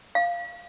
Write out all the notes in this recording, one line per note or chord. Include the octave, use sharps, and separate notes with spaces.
F5